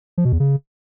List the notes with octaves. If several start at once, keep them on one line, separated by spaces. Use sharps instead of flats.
F3
B2
E2
C#3